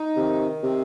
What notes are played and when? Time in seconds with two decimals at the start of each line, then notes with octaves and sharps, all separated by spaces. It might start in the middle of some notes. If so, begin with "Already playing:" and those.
Already playing: D#4
0.16 C3 D#3
0.63 C3 C4